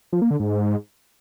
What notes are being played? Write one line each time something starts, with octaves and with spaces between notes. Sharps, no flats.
F3
A#3
D3
G#2